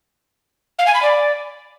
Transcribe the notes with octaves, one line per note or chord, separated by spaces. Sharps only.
F5
G#5
B5
D5